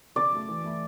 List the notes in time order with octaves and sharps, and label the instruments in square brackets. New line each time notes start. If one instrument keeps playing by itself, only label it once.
[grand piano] C#3 [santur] D5
[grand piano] F#3 A3
E3
A3 E4